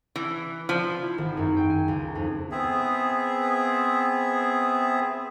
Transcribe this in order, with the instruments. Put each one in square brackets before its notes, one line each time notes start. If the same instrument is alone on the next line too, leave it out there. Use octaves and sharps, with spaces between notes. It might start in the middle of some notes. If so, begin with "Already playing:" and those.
[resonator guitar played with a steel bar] E3
F3
[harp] E4
G#1
F#2
G5
G#5
C#2
D#4
F2
[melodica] B3 C4 G#4 E5